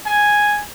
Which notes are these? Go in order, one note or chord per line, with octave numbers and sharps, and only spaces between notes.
G#5